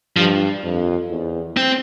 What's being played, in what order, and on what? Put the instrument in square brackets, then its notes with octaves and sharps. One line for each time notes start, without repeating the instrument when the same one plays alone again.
[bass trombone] G2 [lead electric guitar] F3
[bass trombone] F2
E2
[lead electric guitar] C4